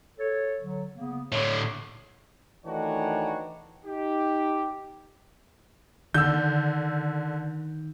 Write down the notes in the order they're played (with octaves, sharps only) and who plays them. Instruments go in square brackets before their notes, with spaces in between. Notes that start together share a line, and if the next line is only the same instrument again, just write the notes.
[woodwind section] A4 C#5
D3 F#3
C#3 A#3 B3
[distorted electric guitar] A2 D3 [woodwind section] C#5
[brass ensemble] D#3 E3 A3 D4 F#4 C#5
D#4 G4
[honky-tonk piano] D3 [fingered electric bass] D#3 [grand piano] E6 G6